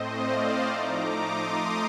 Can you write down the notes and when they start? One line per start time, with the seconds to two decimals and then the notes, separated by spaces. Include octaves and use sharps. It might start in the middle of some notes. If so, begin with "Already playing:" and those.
Already playing: A2 A3 C4 C5 D#5
0.16 D5 F5
0.67 F3 A3 D#4 A#5 D6
1.18 C6 D#6